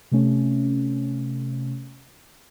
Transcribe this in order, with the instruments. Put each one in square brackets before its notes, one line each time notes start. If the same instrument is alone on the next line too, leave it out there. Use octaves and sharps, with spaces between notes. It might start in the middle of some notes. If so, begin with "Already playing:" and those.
[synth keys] C3 A3 C#4